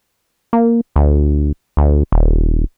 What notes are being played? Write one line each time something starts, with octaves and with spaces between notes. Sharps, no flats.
A#3
D2
D2
D#1